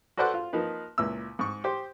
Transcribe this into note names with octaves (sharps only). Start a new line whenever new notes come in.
F#4 A4 B4 C5 D5 F#5
F4
F3 A#3 D#4 B4
C#2 A#2 E4 E6
G#2 C#6
G4 C5